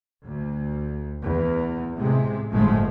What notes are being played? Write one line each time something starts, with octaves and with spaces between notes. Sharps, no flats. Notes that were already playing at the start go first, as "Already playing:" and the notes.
D2
E2
A2 C3 G#3
G1 A2 F3 G#3 A3